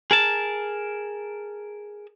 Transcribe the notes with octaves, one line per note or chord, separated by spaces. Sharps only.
G#4 A#4 A5